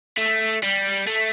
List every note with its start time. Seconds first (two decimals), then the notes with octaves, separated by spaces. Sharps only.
0.18 A3
0.63 G3
1.07 A3